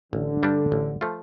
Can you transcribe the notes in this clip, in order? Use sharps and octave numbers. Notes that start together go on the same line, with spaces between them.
A1 D3
G2 G3 D4
A1
F3 A3 F4